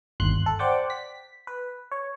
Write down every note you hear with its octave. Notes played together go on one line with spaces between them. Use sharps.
G1 D#2 C6 F#6
A4
C5 D5 F#5 G5 D6
B6
B4
C#5